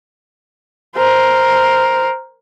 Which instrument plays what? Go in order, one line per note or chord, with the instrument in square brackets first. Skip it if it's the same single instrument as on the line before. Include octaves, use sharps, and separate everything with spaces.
[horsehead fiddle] A#4 C5